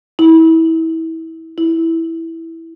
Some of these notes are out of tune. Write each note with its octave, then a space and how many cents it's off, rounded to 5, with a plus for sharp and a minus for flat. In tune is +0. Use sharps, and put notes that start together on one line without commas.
E4 -25
E4 -5